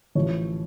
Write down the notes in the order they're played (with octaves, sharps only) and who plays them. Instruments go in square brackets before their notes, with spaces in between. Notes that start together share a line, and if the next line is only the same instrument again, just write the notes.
[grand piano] A1 A2 F3 C#5